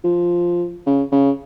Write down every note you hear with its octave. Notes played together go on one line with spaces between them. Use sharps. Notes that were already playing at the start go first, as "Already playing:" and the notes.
F3
C#3
C#3